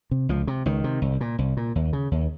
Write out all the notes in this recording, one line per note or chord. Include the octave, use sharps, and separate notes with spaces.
C3
C#2 F3
C3
C#2 D#3
C3
C2
A#2
C2
A#2
D#2
C#3
D#2